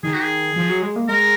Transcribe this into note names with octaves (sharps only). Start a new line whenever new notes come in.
D#3 G#4
F#4
G#4
F3
F#3
G#3
A#3
G#3 A#4